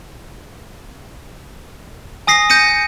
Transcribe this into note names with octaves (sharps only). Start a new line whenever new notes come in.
G#5 D#6 A#6 C7
G6 A#6 C#7 D#7